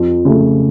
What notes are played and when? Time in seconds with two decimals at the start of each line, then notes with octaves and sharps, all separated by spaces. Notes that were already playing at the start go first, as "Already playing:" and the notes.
Already playing: F2
0.25 C#3 F3 A3